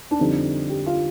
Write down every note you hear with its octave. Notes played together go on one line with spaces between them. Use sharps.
D4
F2 D3 G3 C4 D#4
G4
F4